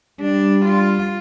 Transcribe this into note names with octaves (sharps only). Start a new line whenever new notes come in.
G3 D4
F4